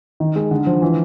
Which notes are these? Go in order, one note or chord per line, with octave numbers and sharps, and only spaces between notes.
D#3
G#3
D3
F3
E3